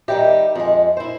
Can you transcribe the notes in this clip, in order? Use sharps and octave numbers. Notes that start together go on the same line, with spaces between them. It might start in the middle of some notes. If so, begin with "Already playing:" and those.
D#3 G3 G4 E5
F2 G#3
E4 C5